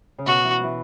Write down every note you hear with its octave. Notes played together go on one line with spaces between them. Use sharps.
C#3
B2 F#4
E3
E3